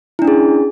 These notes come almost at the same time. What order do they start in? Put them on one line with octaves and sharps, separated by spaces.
E4 D4 C#4 G#4